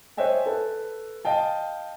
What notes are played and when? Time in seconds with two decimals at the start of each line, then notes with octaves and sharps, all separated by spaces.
0.17 C5 C#5 D#5 E5 G5 G#5
0.46 A4 B4
1.25 D#5 F5 G5 A5